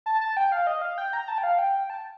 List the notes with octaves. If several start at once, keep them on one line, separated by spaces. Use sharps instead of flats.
A5
A5
G5
F5
D#5
F5
G5
A#5
A5
G5
F5
G5
A5